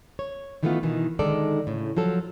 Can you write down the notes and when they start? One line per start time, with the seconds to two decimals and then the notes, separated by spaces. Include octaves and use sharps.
0.19 C#5
0.63 D#3 E3 G3 A3 B3 F4
0.83 B2 D#3 E3
1.19 D3 D#3 G#3 D#4 A4 D5
1.67 A2 C#3
1.97 F3 F#3 A4